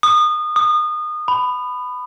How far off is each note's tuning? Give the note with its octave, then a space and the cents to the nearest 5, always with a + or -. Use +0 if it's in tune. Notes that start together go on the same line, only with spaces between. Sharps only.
D#6 -25
D#6 -25
B5 +15